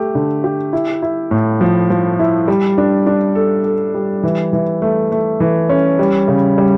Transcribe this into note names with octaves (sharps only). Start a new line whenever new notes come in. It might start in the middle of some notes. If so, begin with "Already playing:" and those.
Already playing: A3 G4
D3
G4
E4
E4
A2
F3
F3
E4
G3
D4
D4
A4
A4
G3
E3
E3
A3
A3
E3
C#4
G3
C#3
G3